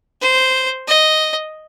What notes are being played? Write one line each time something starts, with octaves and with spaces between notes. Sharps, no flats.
C5
D#5